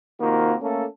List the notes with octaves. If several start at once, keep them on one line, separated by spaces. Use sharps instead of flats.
C3 D#3 A#3 C4 F4 F#4
A3 A#3 C#4 A4